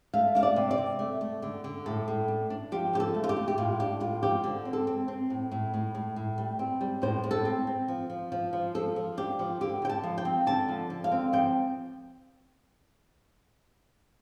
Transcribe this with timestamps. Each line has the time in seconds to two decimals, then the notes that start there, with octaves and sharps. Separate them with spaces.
0.14 A3 F5
0.35 D4 F5
0.43 D5
0.56 C3
0.71 D5
0.78 C3
0.99 A3
1.21 A3
1.42 D3
1.64 D3
1.86 A2 A4
2.08 A2
2.28 D4
2.50 D4
2.72 F3 G4
2.93 D3 G4
3.00 A4
3.15 A3
3.24 F4
3.29 G4
3.37 A3
3.48 G4
3.58 A2 F4
3.80 D4 G4
4.00 A2 F4
4.23 F3 G4
4.44 D3
4.65 C4
4.73 A4
4.87 C4
5.08 C4
5.30 A2
5.52 A2
5.74 A2
5.95 A2
6.16 A2
6.38 G3
6.59 C4
6.81 G3
7.02 A2 C5
7.24 A2
7.31 A4
7.45 C4
7.67 C4
7.88 F3
8.10 F3
8.32 F3
8.53 F3
8.75 F3 A4
8.96 F3
9.17 D4 G4
9.39 F3
9.61 D3 G4
9.82 D3 G5
9.89 A5
10.03 F3
10.18 G5
10.25 C4
10.46 D3 A5
10.69 F3
10.90 D3
11.04 F5
11.11 C4
11.33 F3 G5